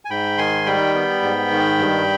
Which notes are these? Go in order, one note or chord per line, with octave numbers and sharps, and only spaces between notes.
G#5
G#2 G5 B5
D#3 G#5 C6
G3 G5 B5
B3
G#2
D#3
G2